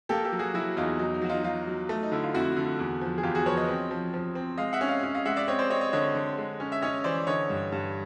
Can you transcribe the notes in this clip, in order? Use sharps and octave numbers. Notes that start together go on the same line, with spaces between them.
A#3 G4 A4
G4 A4
F#3
F#4 G#4
F#3 E4 F#4
E2 D#4 F4
F#3 D#4
D#4
F#3 F#4
D#4 F4
F#3 D#4 F4
F#3
A3
D#4
D3 E4
F4
F2 E4 F#4
D3
E2
F3
G#4
E2 F4 G4
F#4 G#4
F3 B4 C#5
C#5 D#5
C4
F3
F3
C4
G#3 D#5 F5
E5 F#5
C#4
D#5 F5
C#4
D#5 F5
G#3 E5 F#5
D5 E5
C4 C#5 D#5
C5 D5
C4 C#5 D#5
C#5 D#5
D3 C#5 D#5
D3
G#3
C#4
E5
C#4 C#5 D#5
E3 C5 D5
D3 C#5 D#5
G2
G2